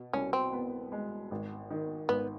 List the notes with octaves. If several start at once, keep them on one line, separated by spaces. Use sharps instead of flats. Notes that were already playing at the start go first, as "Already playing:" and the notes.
Already playing: B2
C2 C#4
C4
B3
G#3
G#1
D#3
G#1 B3